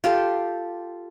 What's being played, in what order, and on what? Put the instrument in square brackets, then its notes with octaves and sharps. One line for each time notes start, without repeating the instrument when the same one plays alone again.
[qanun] F4 G4 A4